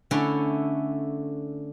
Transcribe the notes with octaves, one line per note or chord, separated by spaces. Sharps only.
D3 A3 C#4 E4